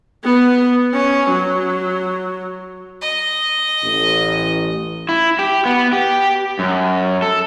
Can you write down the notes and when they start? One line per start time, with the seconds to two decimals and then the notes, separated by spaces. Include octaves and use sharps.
0.24 B3
0.93 C#4
1.30 F#3
3.02 D#5
3.83 A1
5.09 E4
5.39 G4
5.66 B3
5.93 G4
6.59 F#2
7.22 A4